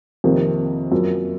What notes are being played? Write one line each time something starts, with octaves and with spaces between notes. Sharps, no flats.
F2 C3 D#3 A#3
F#2 F3 A#3